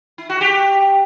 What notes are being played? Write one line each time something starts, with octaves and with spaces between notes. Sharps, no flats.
E4
F#4
G4